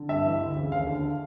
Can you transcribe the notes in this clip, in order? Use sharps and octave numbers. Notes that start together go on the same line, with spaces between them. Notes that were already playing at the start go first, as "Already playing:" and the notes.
Already playing: D3
G2 E5
E3
D2
C#3
D#2 F5
D3